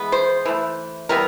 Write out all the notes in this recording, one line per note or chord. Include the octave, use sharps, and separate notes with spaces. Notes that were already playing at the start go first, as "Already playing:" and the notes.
Already playing: E3 G#3 B3
C5
E3 A3
E3 G3 B3 A#4